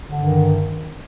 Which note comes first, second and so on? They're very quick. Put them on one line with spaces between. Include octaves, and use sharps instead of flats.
D3 G2 D#3